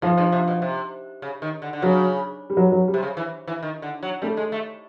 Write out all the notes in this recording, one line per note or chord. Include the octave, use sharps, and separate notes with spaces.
G#2 F3
G2
C3
B2
C3
C#3
D#3
D3
D3
C#3 F#3
G3
F#3
F#3
G3
C3
C#3
E3
E3
D#3
D3
F#3
G3 A3
G#3
A3